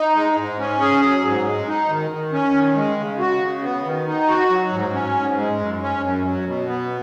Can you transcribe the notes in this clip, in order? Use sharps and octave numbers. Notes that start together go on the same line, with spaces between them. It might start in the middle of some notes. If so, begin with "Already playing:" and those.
Already playing: D#4
G#3
G#2
C#4
G#4
F#3
G#2
G#3
D#4
D#3
D#3
C#4
D#3
G#3
C#3
F#4
C#3
B3
D#3
D#4
F#4
F#3
G#2
C#4
G#2
G#3
F#2
C#4
F#2
F#3
B2
B3